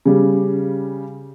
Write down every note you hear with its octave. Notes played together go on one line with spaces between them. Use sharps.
C#3 G3